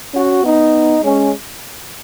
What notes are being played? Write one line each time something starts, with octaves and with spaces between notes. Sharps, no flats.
C#4 F#4
B3 D#4
G#3 C#4